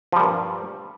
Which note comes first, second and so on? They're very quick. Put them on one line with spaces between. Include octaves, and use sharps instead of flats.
F3 G3 A#2 G2